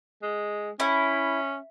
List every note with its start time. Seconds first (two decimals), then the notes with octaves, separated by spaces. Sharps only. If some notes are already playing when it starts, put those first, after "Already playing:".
0.23 G#3
0.80 C#4 E4